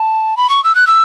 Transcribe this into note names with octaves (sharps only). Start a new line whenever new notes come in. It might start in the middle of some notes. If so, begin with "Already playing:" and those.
Already playing: A5
B5
C#6
E6
F#6
E6